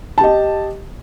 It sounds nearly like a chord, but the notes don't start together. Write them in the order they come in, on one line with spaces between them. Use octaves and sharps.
A5 G4 D#5